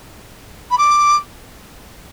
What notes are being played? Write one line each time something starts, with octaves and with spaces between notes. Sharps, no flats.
B5
D6